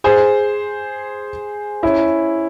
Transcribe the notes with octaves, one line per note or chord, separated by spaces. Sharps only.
G#4 C5
C#4 E4